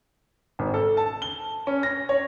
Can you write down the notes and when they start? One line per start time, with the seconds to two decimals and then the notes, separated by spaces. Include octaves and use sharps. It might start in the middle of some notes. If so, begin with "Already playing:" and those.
0.59 G#1
0.74 A4
0.97 A5
1.22 G7
1.67 C#4
1.83 A#6
2.09 C#5